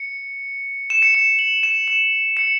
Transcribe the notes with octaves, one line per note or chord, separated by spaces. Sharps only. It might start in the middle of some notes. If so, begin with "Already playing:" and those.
Already playing: C#7
E7
C#7
E7
F#7
E7
E7
C#7